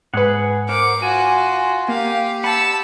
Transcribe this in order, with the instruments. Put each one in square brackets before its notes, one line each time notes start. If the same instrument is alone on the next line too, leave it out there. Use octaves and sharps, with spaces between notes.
[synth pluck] G#2 B4 [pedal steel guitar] G#4 F#5
[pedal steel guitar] A#4 C5 F#5 [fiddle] D6
[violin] F4 [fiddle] F#4 [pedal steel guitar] G#5
[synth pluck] A#3 [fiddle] G4 [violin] F5
[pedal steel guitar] F#5 B5 [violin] A5 E6